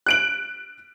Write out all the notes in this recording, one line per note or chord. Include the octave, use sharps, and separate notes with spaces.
F#6 D7 F#7